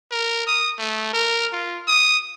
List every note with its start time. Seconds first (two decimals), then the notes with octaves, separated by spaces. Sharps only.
0.12 A#4
0.47 D#6
0.79 A3
1.13 A#4
1.52 F4
1.87 D#6